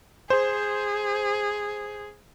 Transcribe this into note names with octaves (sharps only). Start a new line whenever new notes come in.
G#4 C5